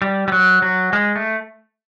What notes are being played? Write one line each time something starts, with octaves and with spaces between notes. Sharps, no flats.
G3
G3
F#3
F#3
G#3
A3